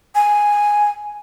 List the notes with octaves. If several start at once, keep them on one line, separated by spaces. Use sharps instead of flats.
G#5